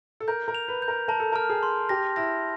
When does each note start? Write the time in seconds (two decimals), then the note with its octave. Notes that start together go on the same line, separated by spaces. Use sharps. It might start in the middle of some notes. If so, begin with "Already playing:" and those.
0.20 A4
0.28 A#4 G6
0.48 A#4
0.55 F7
0.68 B4
0.82 G6
0.88 A#4
1.08 A#4 A5
1.20 A4
1.32 A#4 F6
1.49 G#4
1.63 C6
1.89 G4 A#6
2.16 E4 A#6